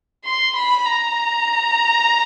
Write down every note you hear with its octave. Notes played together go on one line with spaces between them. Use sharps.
C6
B5
A#5